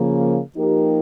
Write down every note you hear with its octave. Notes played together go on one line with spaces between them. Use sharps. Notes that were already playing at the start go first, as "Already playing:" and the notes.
Already playing: C#3 F3 A#3
F3 A#3 D#4 G4 A#4